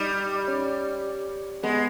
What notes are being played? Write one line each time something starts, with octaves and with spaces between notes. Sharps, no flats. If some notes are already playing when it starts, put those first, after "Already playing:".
Already playing: G3 D#4 G4
C#4
G#3 B3